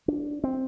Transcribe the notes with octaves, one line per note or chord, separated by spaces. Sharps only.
D4
C4